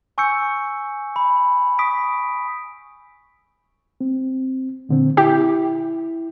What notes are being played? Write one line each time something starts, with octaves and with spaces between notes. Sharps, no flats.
G#5 C#6 E6 G6 C#7
B5
C#6 D#6 B6 D7
C4
A#2 D3 C4
E4 G4